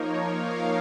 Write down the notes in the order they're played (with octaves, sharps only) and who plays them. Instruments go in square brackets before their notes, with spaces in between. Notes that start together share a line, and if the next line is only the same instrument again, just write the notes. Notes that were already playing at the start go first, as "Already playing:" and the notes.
Already playing: [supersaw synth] F3 A#3 D#4 A#4 C#5
F5